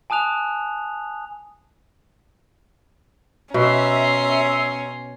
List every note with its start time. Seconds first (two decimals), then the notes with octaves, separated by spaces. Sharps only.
0.10 G#5 A5 D#6 F#6 F7
3.54 B2 C#4 E5 A#5 C6